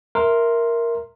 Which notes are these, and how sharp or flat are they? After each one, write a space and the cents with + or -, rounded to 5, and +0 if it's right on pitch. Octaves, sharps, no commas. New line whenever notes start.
A#4 +0 E5 +0 C6 +0